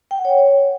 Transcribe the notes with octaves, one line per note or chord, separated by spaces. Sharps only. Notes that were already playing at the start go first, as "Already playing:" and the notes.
G5
F#5
C#5